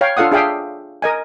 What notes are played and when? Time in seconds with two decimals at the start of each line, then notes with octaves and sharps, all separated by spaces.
0.01 C#5 F5 G5
0.17 D4 F4 A4 F5 F#5 D#6
0.32 D4 G#4 E5 F5 G5 D#6
1.02 A#4 D#5 G#5